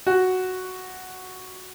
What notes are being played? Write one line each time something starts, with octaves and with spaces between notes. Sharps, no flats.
F#4